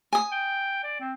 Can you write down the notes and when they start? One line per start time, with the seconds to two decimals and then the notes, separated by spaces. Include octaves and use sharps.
0.13 G#5 D#6
0.32 G5
0.84 D5
1.00 C4